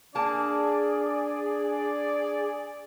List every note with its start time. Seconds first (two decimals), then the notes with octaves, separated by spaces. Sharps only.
0.15 A#3 D4 G#4 D5 A5